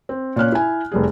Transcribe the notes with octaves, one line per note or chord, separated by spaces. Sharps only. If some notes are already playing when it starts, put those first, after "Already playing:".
C4
A#2 C#4 F6 F#6
E4 G#5
F1 G3 G#4